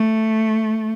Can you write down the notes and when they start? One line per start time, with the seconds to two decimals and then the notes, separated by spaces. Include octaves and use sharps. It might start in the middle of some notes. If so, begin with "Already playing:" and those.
Already playing: A3